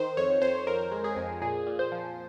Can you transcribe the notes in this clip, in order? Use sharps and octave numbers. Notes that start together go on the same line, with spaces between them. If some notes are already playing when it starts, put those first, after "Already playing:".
Already playing: D#3 C5
F2 C#5
F2 C5
F2 A#4
G#3
G#4
F2
A#2 G#4
A#2
C5
F3